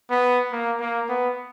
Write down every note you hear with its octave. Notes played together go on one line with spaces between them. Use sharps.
B3
A#3
A#3
B3